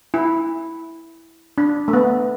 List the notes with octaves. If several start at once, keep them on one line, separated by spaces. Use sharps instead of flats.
E4
D4
A3
B3